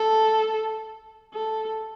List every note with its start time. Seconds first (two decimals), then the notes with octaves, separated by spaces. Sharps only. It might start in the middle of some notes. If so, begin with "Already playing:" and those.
Already playing: A4
1.34 A4